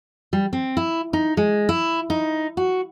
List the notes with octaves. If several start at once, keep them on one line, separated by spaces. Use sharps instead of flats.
G3
C4
E4
D#4
G#3
E4
D#4
F#4